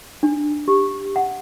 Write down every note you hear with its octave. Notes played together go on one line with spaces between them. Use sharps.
D4
G4
F#5